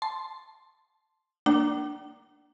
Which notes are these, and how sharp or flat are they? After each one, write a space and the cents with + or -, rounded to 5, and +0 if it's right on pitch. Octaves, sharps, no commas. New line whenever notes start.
A5 +0 C6 +0
A#3 +0 D4 +0 G5 -45